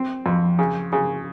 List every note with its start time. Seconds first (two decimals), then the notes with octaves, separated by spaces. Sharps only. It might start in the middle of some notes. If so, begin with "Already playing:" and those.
Already playing: C4
0.26 F2
0.59 C#3
0.93 C#3